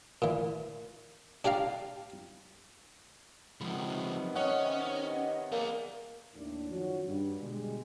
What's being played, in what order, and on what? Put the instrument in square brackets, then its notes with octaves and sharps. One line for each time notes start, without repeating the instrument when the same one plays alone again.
[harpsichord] A#2 E3
D4 G4 D5 F5 A#5
[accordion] C3 D#3 B3 [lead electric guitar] F3 G#3 [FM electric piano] B5
[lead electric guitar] C#4 [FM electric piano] C#5 D#5 F#5
[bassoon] A#3 [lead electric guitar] G#4 D5
[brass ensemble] D#2 A2 D4
F#2 D#3 F3 C#4 F#4
G2
B2 D3 G3 G#3